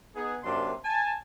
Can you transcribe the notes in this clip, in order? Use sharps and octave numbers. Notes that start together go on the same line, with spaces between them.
B3 D#4 G#4
F#2 C3 A#3 D4 C6
G#5 A5